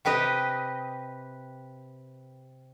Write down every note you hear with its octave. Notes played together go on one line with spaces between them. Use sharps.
C3 G4 B4 D#5